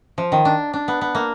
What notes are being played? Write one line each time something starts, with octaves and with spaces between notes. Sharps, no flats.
F3
D#3
D4
D4
B3
B3
A#3